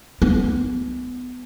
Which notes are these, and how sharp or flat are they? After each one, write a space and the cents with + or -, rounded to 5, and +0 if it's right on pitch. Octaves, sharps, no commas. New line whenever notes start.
B3 +20